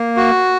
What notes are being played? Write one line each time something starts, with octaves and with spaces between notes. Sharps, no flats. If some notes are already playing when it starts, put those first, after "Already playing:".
Already playing: A#3
F#4